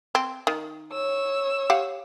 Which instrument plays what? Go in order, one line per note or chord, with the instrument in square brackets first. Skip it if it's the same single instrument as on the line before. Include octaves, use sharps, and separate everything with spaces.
[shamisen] C4
D#3
[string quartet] C#5 E6
[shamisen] G4 F5 F#5